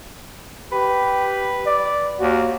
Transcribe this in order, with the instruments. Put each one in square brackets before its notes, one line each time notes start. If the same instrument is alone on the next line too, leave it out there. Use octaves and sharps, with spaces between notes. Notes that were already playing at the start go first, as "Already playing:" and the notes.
[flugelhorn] G4 [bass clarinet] B4
[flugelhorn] D5
[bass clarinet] D#2 [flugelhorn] F#4